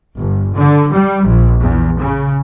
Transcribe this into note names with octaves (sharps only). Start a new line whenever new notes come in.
G1
D3
G3
A#1
E2
C#3